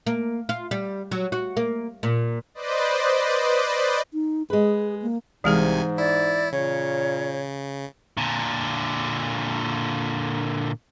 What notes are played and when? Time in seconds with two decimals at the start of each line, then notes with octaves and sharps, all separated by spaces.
0.07 A#3
0.49 F4
0.71 G3
1.11 F#3
1.32 F#4
1.57 A#3
2.03 A#2
2.54 B4 C5 D5 D#5
4.13 D#4
4.50 G#3 G#4 B4
5.02 A#3
5.44 C2 G#2 C3 E3 G#3 G#4 G#5
5.98 E4 D5
6.52 A#2 C#3 C#5
8.17 A#2 D3